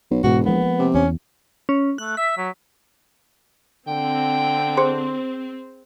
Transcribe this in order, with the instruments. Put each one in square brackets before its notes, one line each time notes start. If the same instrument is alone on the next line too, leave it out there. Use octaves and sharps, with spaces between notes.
[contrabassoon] B1
[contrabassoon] E1 [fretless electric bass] G#2 B2 G#3 [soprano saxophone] F#4
[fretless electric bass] F3 G#3 A#3 [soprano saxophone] B3
[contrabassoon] C3
[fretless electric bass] E2 [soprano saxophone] C#4
[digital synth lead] C#4
[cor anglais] A3 [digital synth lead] F#6
[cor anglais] E5 [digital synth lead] B6
[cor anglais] F#3
[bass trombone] D3 [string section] C4 [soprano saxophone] G5
[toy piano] G#4 C5 C6